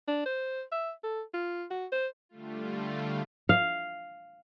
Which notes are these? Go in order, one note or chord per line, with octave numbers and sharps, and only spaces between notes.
D4
C5
E5
A4
F4
F#4
C5
D3 G3 A3 F4
F5